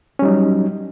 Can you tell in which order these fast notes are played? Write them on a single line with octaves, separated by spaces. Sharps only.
C#4 G3 D#4 F#3